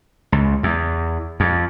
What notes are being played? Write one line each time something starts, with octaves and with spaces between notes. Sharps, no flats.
C#2
E2
F2